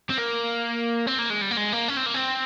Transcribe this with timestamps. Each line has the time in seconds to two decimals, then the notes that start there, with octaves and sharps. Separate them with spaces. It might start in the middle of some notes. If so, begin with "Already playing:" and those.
0.10 C4
0.19 A#3
1.07 C4
1.19 A#3
1.30 G#3
1.42 G3
1.51 A#3
1.57 G#3
1.72 A#3
1.88 C#4
1.97 C4
2.06 A#3
2.15 C4